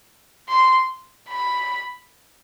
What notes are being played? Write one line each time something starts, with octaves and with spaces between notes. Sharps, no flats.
C6
B5